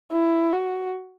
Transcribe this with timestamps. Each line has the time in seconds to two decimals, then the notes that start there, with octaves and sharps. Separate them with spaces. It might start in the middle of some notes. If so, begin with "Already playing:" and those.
0.12 E4
0.52 F#4